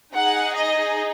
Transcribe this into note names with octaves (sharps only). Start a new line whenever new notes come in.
D#4 G#4 F#5
D#5